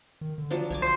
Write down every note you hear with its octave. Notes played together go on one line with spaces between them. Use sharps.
D#3
D3
F3 F#3 D4
B1 C#5 G#5 D6
C5